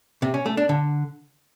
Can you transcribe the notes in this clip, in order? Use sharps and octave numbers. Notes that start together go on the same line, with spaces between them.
C3
C#4
A3
D4
D3